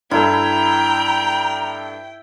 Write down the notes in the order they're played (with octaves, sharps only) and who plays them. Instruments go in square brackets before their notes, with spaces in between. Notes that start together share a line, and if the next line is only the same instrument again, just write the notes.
[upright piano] G2 A4 [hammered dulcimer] E4 [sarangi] G5 [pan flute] A#5